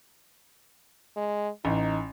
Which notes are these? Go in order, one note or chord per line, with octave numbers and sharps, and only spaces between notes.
G#3
A1 D#4